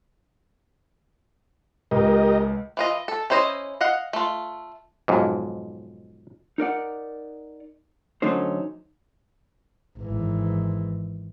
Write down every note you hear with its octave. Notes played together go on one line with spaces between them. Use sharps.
C#2 G4 A#4 D#5
E3 F4 D#5
A4
C#4 E4 C5 C#5 D#5
D#5 F5 F#5
A3 F4
B1 F2 G#2
D#4 A#4 D5 F#5
D3 F#3 A3 C#4 D#4 C5
G#1 E3